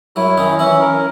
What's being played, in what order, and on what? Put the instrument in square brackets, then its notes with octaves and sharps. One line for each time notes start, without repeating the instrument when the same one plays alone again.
[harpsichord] F#2 F#3 [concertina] E4
[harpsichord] D#3 D#4 [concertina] C#4
[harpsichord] E3 E4 [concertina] C#4
[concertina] A#4